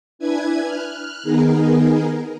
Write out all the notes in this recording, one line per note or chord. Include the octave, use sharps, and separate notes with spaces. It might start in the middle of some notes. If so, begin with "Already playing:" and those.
D4 E4 B4 G#5 G#6
F6 F#6
D#3 B3 D#4 G#4 A#4